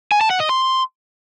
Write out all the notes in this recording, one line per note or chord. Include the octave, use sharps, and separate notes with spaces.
G#5
A5
F#5
D#5
C6